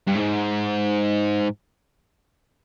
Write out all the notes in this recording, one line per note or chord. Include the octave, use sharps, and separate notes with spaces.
G2
G#2